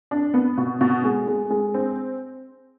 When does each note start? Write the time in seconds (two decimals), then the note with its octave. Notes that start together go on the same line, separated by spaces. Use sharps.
0.11 D4
0.34 B3
0.58 B2
0.81 B2
1.04 G#3
1.27 G#3
1.50 G#3
1.74 C4